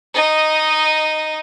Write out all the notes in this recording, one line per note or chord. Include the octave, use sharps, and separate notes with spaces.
D#4 D#5